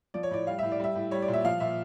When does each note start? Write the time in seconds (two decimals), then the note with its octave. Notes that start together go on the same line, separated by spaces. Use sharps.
0.14 F3 D5
0.23 C#5
0.31 A2 D5
0.47 G3 F5
0.59 A2 E5
0.72 D5
0.80 G3 E5
0.95 A2
1.11 G3 C#5
1.22 D5
1.28 A#2
1.33 E5
1.45 F3 F5
1.60 A#2 E5